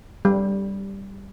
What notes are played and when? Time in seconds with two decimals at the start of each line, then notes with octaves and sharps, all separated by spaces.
0.25 G3